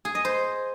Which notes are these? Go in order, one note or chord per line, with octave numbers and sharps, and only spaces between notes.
G#4
D#5
C5